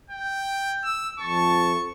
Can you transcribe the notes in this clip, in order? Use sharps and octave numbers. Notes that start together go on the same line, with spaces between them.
G5
E6
F2 A5 C#6